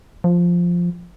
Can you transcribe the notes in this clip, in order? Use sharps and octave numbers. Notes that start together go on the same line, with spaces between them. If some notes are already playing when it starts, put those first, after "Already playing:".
F3